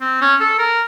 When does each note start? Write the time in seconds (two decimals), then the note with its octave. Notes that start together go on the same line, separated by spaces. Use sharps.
0.01 C4
0.21 C#4
0.40 A4
0.59 A#4